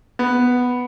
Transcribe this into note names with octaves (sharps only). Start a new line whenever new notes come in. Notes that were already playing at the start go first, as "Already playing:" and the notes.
B3